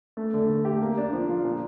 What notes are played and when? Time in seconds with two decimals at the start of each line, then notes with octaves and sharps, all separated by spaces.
0.17 A3
0.34 D3
0.50 A3
0.65 G4
0.82 A#3
0.98 D4
1.13 F3
1.29 F4
1.44 A#2